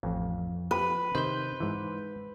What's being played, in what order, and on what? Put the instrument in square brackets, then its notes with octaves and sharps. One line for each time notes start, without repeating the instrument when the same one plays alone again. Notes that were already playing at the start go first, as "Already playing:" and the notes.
[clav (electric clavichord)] A1 [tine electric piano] F2
[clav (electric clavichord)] F3 G4 [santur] B4
[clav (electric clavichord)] C3 D#3 [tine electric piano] C5 G6
[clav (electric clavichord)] G#2 E3